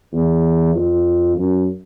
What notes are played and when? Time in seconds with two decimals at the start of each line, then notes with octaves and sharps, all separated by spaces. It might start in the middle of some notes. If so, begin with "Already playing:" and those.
0.13 E2
0.75 F2
1.37 F#2